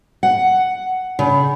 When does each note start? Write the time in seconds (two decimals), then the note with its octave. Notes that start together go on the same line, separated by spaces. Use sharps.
0.23 F#5
1.19 C#3